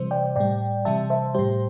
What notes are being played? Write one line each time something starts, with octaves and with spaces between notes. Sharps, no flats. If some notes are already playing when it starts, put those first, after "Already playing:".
Already playing: C3 E3 G3 C5
D5 G5
A2 G3 D5 G5
C3 E3 G3 E5 A5
C5 E5
A2 G3 G4 C5